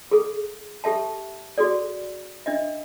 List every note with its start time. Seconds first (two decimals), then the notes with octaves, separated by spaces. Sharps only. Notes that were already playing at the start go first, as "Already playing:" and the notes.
0.11 G#4 A4
0.84 G4 A4 E5 A5
1.58 F#4 G#4 A4 D5
2.46 D4 D#5 E5